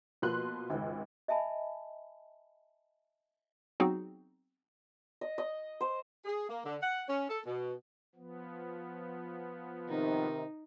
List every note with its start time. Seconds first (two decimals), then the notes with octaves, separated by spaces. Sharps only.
0.22 B2 F3 A#3 B4 C6 F#6
0.70 G#1 C#2
1.28 D#5 E5 G#5 A5 B5
3.80 F#3 B3 C4 D#4 F#4 G#4
5.21 D#5
5.38 D#5
5.81 C5
6.25 G#4
6.49 A#3
6.64 D3
6.82 F#5
7.08 C#4
7.29 A4
7.46 B2
8.15 F3 B3
9.89 C3 D#3 D#4